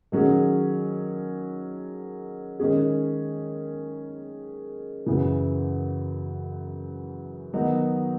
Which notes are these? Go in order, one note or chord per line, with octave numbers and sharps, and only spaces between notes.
D#3 F#3 C#4 G#4
D#3 G#3 C#4 G#4
F#2 C#3 E3
D#3 F#3 B3 D#4 F#4